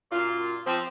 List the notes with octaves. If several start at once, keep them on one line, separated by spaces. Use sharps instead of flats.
F#2 A#2 F4
F3 C4